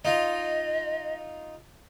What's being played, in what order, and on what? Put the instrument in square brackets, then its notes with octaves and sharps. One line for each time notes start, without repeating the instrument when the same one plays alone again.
[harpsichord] D#4 F4 [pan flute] D#5